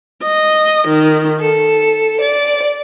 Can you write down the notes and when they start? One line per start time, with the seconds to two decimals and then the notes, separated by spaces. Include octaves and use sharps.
0.22 D#5
0.87 D#3
1.41 A4
2.21 D5